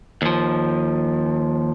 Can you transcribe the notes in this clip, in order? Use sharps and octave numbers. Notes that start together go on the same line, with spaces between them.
D#2 F3